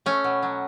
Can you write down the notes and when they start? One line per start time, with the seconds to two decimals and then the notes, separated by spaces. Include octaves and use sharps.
0.06 A3 C#4
0.24 B2
0.43 F#3